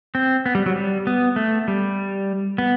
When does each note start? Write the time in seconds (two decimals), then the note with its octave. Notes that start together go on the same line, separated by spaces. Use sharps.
0.15 C4
0.46 B3
0.55 G3
0.66 F#3
0.76 G3
1.07 B3
1.36 A3
1.68 G3
2.58 B3